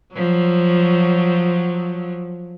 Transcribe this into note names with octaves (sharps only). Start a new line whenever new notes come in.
F3 F#3